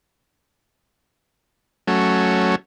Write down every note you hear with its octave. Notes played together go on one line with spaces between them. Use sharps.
F#3 A3 C#4